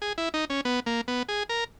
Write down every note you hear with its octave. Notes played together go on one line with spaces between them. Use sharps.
G#4
E4
D#4
C#4
B3
A#3
B3
G#4
A#4